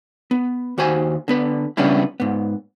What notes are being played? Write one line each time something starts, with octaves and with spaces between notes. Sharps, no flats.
B3
D#2 F#4 C5 G#5
D3 B3 B4
C#3 G3 B3 C#4 D4 E4
G#2 B3